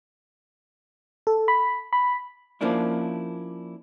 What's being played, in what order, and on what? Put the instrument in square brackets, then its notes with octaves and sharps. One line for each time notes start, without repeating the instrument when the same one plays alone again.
[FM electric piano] A4
B5
B5
[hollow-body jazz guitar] F3 A#3 C#4 D4 E4